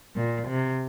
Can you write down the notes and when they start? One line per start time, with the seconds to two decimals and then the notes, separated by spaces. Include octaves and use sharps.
0.16 A#2
0.48 C3